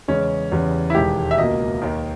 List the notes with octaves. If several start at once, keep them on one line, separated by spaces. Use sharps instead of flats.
E2 C#3 G#3 C#4
E2 C#3 G3
E4
E1 D#2 D#3 G#3 G4
E5
C#2 B2 A#3 D#5
D#2 D#3 A#3